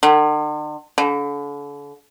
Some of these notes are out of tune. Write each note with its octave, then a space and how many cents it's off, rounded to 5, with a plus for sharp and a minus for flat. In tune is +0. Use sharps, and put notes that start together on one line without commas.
D3 +45
D3 -40